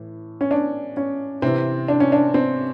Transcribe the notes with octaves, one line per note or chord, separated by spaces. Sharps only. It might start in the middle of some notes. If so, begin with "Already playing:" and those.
Already playing: A2 E3
C#4
D4
C#4
C3 E3 C4
D4
C#4
D4
C4